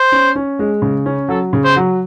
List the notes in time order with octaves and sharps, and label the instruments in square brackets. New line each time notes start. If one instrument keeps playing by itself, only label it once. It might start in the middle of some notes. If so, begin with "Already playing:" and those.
Already playing: [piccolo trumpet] C5
[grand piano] C#4
C#4
G#3
C#3
C#4
[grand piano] F#3 [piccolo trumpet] A4
[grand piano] C#3
[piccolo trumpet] C5
[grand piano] F#3